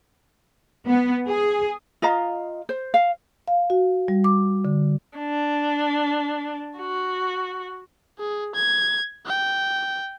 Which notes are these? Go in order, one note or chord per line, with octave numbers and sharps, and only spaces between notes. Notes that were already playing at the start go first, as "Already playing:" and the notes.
B3
G#4
F4 D#5 F5 A#5
C5
F5
F5
F#4
G3
D6
D3
D4
F#4
G#4
G#6
G5